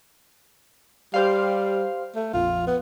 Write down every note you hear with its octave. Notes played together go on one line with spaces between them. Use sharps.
G3 G4 C5 F5
A3
A#1 F2 F4
B3